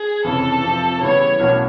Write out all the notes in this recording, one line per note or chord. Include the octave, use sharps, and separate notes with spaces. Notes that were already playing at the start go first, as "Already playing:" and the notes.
Already playing: G#4
F1 F2 C#3 E3 A4
F2 C3 F3
C#3 E3 G3 B3 E4 C#5
B1 A2 F#3 A#3 C#4